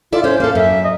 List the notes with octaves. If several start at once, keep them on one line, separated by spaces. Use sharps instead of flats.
E4 F4 A4 D5
C#4 C5
A#3 A4 F5
F#2 E5
D#5